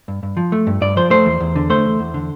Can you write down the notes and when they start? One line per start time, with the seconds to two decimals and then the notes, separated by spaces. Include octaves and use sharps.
0.08 G2
0.23 G2
0.37 F3
0.52 A3
0.67 G2
0.81 G2 D5
0.97 F3 C5
1.10 A3 C5
1.26 E2
1.40 E2
1.56 D3
1.70 A3 C5
1.84 E2
1.99 E2
2.14 D3